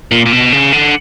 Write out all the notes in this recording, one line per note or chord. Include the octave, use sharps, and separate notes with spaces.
A#2
A#2
B2
C#3
D3